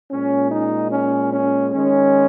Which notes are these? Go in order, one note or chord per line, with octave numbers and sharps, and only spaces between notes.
A#2 G#3 C#4
D#4
C#4
C#4
D#3 G#3 C#4